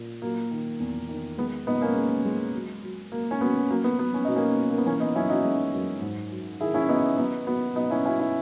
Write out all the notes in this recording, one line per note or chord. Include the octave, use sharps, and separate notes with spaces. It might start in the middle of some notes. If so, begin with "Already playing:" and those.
Already playing: A#2
F#3 A#3
D#3
E2
D#3
G#3 B3
A#2 B3 D#4
A#3 C#4
G#3
G#3
F#3
F#3
F#3 A#3
C#4
F#3 B3
F#3 A#3
B3
F#3 B3
C#4
B2 D#4
A#3 C#4
B2
A#3
B3
E3 A#3 C#4
B3 D#4
F#2 C#4 E4
D#4 F#4
G#3
F#2
G#2
F#3
D#3 E4 G#4
C#4 E4
F#3 B3 D#4
F#3 B3 D#4
F#3 B3
B2 B3 D#4
C#4 E4
F#3 C#4 E4
C#4 E4